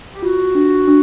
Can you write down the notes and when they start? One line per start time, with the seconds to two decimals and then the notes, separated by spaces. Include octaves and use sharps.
0.14 G4
0.22 F4 F#4
0.55 D4
0.88 D4